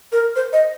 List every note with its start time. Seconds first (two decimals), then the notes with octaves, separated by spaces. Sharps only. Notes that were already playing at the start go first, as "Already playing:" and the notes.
0.12 A#4
0.36 C5
0.53 D#5